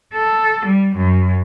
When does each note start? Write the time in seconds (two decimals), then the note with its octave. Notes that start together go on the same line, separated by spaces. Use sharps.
0.14 A4
0.66 G3
0.96 F#2